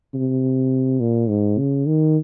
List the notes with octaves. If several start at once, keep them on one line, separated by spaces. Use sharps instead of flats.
C3
A#2
G#2
C#3
D#3